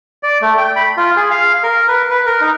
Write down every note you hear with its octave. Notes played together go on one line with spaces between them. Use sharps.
D5
A3
G5
B5
F4
G#4
F5
A#4
B4
B4
A#4
D#4